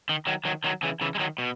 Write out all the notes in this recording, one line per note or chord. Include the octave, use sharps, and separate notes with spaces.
D#3
D#3 F#3
D#3 F#3
D#3 F#3
C#3 E3
C#3 E3
G#3
D#3 F#3
B2